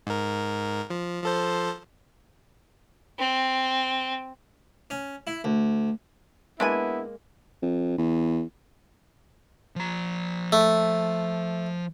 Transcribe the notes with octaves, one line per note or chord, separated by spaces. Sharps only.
G#2 A#4
F3
F3 A4 C5
C4
C#4
E4
D2
G#3 A#3 B3 D4 E4 B4 G#5
F2
E2
F3 A#5
A3